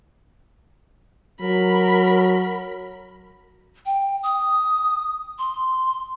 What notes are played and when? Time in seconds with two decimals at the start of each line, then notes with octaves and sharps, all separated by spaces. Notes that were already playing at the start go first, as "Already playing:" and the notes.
1.41 F#3 A#4 B5
3.86 G5
4.23 D#6
5.39 C6